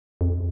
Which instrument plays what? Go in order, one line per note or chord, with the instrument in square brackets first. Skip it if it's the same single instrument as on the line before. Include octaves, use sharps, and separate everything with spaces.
[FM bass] F2